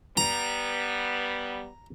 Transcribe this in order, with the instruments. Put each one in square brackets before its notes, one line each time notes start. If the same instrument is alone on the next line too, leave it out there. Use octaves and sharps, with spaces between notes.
[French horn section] G3 B3 [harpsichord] A#5